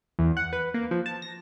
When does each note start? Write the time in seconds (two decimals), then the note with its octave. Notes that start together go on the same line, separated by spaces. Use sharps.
0.19 E2
0.37 F#5
0.53 B4
0.74 A#3
0.91 F3
1.06 A5
1.22 A#6